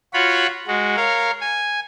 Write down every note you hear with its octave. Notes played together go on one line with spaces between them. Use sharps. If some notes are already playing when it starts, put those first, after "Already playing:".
F4 F#4 C#5 B5
G#3 F#4
A#4 C#5 F5
G#5